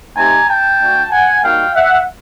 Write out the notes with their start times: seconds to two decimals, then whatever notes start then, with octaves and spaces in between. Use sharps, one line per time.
0.17 A3 C4 D#4 G4 G#5 A#5
0.48 G5 A5
0.80 A3 D4 F#4
1.11 F#5 G#5
1.43 G3 A#3 D#4 F#4 F5 G5
1.75 E5 F#5